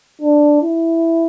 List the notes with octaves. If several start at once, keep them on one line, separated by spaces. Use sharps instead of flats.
D4
E4